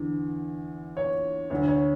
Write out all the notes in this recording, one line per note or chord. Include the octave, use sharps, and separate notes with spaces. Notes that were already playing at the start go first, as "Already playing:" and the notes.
Already playing: E2 D3
C#5
D2 D3 C#5
C#5